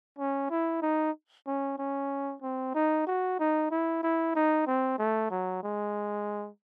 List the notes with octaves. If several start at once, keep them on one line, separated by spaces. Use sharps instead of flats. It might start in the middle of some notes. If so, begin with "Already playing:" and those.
C#4
E4
D#4
C#4
C#4
C4
D#4
F#4
D#4
E4
E4
D#4
C4
A3
F#3
G#3